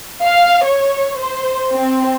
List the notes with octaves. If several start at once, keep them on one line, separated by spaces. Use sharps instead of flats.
F5
C#5
C5
C4